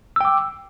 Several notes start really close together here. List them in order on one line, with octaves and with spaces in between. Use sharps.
E6 G5 D6